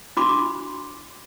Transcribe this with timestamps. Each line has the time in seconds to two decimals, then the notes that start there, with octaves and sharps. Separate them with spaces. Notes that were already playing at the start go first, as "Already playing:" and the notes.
0.17 D4 F#4 B5 C6 D6